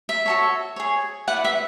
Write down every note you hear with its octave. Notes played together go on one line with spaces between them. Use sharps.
E5
F#4 A4 C#5
G#4 C#5
E4 B4 D5 F#5
E5